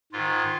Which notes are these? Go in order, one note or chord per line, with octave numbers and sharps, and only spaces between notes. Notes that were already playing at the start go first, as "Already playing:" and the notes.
G#2 D#3 F4